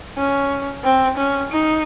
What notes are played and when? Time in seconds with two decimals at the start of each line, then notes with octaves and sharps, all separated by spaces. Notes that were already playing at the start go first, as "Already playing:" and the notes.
0.17 C#4
0.84 C4
1.17 C#4
1.52 D#4